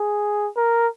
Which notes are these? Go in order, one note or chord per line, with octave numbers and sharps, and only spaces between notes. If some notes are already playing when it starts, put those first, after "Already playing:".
Already playing: G#4
A#4